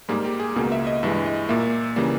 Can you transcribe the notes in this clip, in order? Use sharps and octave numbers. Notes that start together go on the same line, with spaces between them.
G#2 G3 A#3 G#4
G4
G#4
C#2 B2 A#3 G#4
E5
D#5
G2 E3 G#3 E5
D#5
A#2 A#3 E5
C#3 E3 G3 A#3